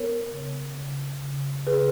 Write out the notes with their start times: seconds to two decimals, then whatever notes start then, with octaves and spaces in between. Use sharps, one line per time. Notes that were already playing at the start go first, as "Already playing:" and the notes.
Already playing: B3 A#4 C#5
0.31 C#3
0.76 C#3
1.22 C#3
1.67 C#3 G#4 B4